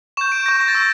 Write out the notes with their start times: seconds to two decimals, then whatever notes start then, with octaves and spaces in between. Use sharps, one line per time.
0.17 C#6 G6 E7
0.32 D7
0.46 C#6 G6 A#6
0.61 A#6
0.68 A6
0.75 C#6 E6 G6